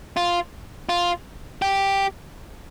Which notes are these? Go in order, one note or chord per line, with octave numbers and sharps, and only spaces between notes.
F4
F4
G4